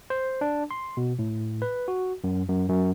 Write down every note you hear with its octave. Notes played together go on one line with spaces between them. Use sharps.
C5
D4
C6
B2
A2
B4
F#4
F#2
F#2
F#2